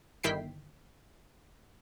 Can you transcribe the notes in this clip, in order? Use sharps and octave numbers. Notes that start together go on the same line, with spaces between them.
G1 D#3 E4 G5 B6 C7